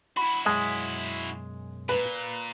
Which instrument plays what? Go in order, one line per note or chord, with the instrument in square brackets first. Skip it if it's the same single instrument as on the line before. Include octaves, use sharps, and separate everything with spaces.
[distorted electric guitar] E4 F#4 [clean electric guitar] B5
[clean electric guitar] B1 F#2 G#5 [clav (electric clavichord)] G#3
[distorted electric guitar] A#2 [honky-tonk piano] B4